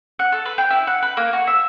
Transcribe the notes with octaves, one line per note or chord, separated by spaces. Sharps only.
F#5
A4
B4
G5
E4
F#5
B4
A#3
F#4
E5